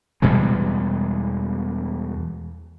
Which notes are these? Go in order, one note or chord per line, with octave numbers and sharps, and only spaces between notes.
E2 B2 G3 G#3